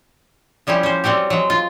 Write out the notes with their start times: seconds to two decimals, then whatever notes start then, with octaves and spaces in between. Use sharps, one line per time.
0.67 F3 G3 C#4 E4 G4
0.83 C#4 C5
1.04 F#3 G3 C4 F#4 G4
1.30 F#3 G#3
1.50 F4